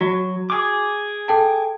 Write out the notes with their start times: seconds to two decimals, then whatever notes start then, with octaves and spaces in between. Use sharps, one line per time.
0.01 F#3 F#4
0.50 G#4 D6
1.28 A4 G5 A5